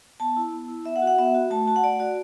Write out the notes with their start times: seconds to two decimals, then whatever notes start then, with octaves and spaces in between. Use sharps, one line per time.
0.20 B3 A5
0.36 E4
0.53 B3
0.68 E4
0.85 B3 E5
0.96 F#5
1.02 F#4
1.07 F#5
1.18 B3 E5
1.35 F#4
1.50 A3 A5
1.67 F#4 A5
1.76 F#5
1.84 A3 D5
2.00 F#4 D5